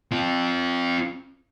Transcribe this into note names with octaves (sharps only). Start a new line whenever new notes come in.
C4 F4